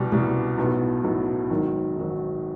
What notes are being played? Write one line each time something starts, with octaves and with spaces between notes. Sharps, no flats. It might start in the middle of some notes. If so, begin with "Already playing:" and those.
Already playing: C2 B2 G3
C2 B2 G3
B1 A2 F#3 B3
B1 A2 F#3 B3
G#1 G#2 D#3 F#3
G#1 G#2 D#3 F#3